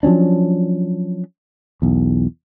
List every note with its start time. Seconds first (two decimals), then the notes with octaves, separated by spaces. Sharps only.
0.03 F3 F#3 C#4 D4
1.82 B1 E2